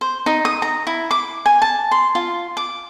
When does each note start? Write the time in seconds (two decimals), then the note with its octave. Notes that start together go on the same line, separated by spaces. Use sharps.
0.01 C5
0.26 D#4
0.45 D#6
0.62 A#5
0.87 E4
1.11 D6
1.46 G#5
1.62 A5
1.91 C6
2.15 F4
2.57 D6